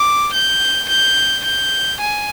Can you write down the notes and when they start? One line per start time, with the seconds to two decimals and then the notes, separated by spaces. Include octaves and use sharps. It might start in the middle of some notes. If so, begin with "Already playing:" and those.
Already playing: D6
0.33 G6
0.89 G6
1.45 G6
2.00 G#5